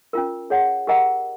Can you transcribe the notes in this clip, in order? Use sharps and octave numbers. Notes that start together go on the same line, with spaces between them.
C#4 F4 A#4
G#4 C#5 F#5
G4 A#4 D#5 F#5 A#5